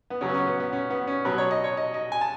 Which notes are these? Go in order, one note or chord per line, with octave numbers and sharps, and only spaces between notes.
B3
C#3 F#3 C#4
B3
C#4
B3
B3
C#4
B3
C#4
B2 F#3 B4
C#5
D#5
C#5
D#5
D#5
G#5
A5